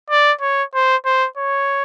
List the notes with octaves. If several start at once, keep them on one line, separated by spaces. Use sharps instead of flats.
D5
C#5
C5
C5
C#5